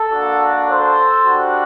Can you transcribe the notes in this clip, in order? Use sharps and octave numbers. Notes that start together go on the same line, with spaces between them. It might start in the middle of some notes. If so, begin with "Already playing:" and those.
Already playing: A4
A#3 D4 F#4
A4 C5
G3 D4 F#4